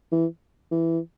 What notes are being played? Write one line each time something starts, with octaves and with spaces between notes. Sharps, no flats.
E3
E3